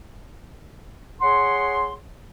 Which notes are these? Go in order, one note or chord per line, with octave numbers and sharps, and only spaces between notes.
G#4 C#5 F#5 C6